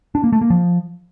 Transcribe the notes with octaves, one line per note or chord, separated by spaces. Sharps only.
D4
A#3
A3
A#3
F3